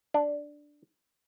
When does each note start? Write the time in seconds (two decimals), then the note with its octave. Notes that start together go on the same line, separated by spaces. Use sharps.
0.14 D4